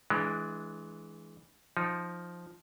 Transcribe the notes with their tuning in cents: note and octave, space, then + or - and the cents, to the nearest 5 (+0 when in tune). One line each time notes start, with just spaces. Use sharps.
E3 -5 G#3 +20 D4 +0
F3 +0 D#4 +0